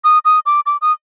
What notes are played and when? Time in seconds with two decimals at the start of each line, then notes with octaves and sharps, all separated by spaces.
0.04 D#6
0.25 D#6
0.46 D6
0.66 D6
0.82 D#6